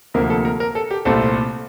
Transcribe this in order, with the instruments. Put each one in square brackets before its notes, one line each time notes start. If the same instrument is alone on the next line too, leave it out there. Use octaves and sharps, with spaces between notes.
[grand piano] D2 C3 F3 A#3 A#4
A4
A#4
A#4
A4
G4
C2 A#2 A3 C4 A4